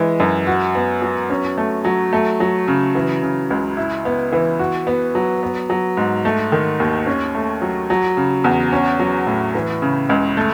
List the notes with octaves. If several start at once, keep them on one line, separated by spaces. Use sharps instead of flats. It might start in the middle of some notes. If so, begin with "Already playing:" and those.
Already playing: E3 G#3
F#2
F#4
B3
F#3
C#4
A3
F#3
A3
F#3
C#3
E3
C#3
C#2
E4
B3
E3
F#4
B3
F#3
B3
F#3
G#2
A3
D#3
D#2
C#4
A3
F#3
F#3
C#3
E2
C#4
F#3
A2
E3
C#3
C#2
A3